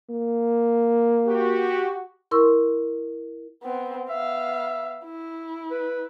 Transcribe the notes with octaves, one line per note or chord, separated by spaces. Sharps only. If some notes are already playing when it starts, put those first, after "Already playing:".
A#3
F#4 G4
E4 A#4 C6 C#6 E6
B3 C4
B3 E5 F5
E4
B4